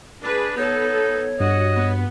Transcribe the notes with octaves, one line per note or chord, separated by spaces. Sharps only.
D4 G#4 B4
B3 D#4 A4 C#5
G2 F#4 D#5
B3